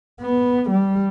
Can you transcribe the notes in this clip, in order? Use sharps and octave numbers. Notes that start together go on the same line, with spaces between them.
B3
G3